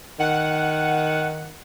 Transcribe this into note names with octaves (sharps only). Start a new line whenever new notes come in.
D#3 F#5